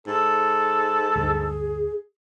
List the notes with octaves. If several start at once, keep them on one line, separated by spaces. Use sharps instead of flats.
G#2 A4
G1 D2 G#4